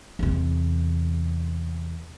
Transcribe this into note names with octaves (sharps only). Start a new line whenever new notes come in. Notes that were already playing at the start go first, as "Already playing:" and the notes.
E2 C3